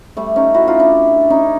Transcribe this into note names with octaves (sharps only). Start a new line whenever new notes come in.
G3 A3
C#4 D#4
E4 F#4
D#4 F4
D4 E4
C#4 D#4